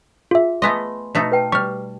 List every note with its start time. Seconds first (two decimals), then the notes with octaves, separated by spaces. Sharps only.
0.31 F4 G#4 E5
0.62 A3 B3 D#5 G#5 C6
1.15 B2 A3 D#4
1.32 B4 G5 A5
1.52 G3 C#6 F6